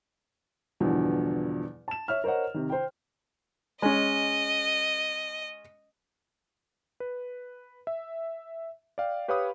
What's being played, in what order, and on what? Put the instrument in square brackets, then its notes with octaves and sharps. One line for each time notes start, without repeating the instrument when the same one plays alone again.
[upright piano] E2 G2 B2 D3 F3
A5 E7
C#5 E5 F6
A#4 C5 C#5 D#5 F#5
C3 D#3
C5 G5
[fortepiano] G#3 C#4 [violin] D#5
[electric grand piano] B4
E5
D5 F5 G5
G4 B4 C#5 F5 B5 D#6